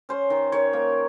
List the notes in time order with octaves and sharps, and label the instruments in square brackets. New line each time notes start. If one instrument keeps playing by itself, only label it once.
[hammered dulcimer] C#4 C5
D#3
D#3 C#5
A#3